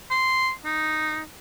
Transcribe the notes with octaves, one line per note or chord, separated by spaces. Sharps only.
C6
D#4